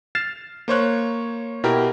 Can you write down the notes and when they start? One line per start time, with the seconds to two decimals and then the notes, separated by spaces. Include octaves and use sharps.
0.15 F6 A6 C7 E7
0.68 A#3 C5 C#5 F#6
1.64 B2 E4 G4 A#4